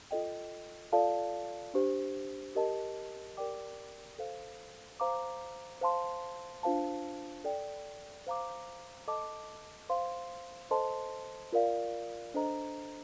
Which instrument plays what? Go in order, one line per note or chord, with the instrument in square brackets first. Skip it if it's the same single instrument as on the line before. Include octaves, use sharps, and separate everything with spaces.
[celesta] F4 A4 D#5 G5
F4 A4 D5 F5 A5
D4 G4 C5
G4 A#4 D#5 A5
G4 A#4 D5 G5 D6
A4 C5 F5
C5 F5 A#5 D6
C5 F5 A5 C6
D4 F4 C5 F5 A5
A4 D5 G5
C5 F5 A#5 D6
A4 D#5 A5 D6
C5 F5 C6
A4 C5 D#5 A5 C6
F4 A#4 D5 F5
D4 A4 C5 D#5 A#5